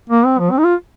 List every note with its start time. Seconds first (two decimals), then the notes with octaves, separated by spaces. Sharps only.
0.10 A#3
0.26 C4
0.39 F3
0.51 C4
0.58 D#4
0.64 F4